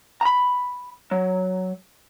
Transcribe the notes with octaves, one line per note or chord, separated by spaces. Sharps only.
A#5 B5
F#3